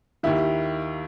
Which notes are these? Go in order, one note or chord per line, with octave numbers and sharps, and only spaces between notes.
D#2 D#3 E4 G4